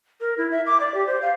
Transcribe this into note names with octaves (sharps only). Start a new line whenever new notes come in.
A#4
E4
E5
D6
D5
G4
C5
F5